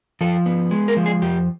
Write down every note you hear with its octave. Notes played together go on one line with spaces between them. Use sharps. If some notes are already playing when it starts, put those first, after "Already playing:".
F3 A4
B3
G#3
A#4
F3
G#4
F2 G4